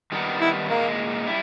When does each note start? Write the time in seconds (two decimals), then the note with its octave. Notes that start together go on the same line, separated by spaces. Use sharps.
0.12 D#3 G3 B3 D#4
0.41 E4
0.69 A#2 G#3 A#3 D#4 A#4
1.27 G3 E4